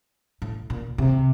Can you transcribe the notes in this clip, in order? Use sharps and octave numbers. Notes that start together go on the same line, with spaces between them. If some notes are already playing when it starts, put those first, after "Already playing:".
A2
A#2
C3